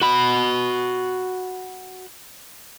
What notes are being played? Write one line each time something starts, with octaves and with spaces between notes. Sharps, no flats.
F#4 B5